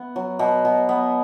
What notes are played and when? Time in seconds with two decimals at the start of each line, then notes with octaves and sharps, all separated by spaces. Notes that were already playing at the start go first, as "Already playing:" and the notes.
Already playing: B3
0.16 F#3
0.39 B2
0.65 B2
0.89 B3